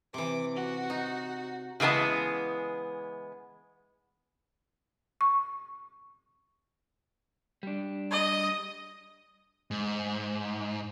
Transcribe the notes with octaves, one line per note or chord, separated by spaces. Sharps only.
C3 E3 D6
F#4
D#4
C#3 E3 G#3 B3 A5
C#6
G3 D4
D#5
G#2